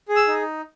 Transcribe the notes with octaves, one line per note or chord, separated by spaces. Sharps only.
G#4
E6
D#4